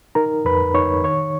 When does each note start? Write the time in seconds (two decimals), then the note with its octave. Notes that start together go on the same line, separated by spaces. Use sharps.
0.15 D#4 A#4 A#5
0.45 F2 B4 B5
0.74 D#4 C#5 C#6
1.04 D#3 C#5 C#6